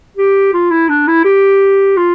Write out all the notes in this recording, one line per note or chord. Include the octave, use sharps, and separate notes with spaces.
G4
F4
E4
D4
E4
G4
F4